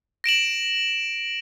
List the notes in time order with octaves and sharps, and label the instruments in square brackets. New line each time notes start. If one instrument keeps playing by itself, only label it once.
[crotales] A#6 D7 E7 F#7